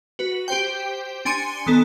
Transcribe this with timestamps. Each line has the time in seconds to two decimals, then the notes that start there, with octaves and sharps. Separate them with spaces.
0.19 F#4 B4
0.48 G4 C5 G5
1.25 D4 G#5 C6 C#7 D#7
1.67 D#3 B3 A4